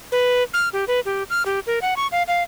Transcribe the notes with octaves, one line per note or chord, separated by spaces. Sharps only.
B4
F6
G4
B4
G4
F6
G4
A#4
F#5
C#6
F5
F5